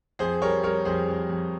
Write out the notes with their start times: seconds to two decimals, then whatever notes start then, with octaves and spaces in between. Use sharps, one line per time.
0.19 F2 G#4 C5
0.42 G3 A#4 C#5
0.64 G3 A#4 C#5
0.85 F2 G#4 C5
1.08 F2
1.29 F2